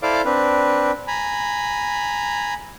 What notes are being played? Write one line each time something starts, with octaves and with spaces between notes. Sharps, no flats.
E4 A4 C5 D5 F5 D6
C4 D4 B4
G#5 A#5 B5